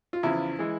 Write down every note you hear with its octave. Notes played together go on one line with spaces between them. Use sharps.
F4
E2 C#3 F3 E4
E3 G#3